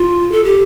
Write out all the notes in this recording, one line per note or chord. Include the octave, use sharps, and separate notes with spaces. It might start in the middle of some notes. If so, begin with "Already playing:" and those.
Already playing: F4
A4
G4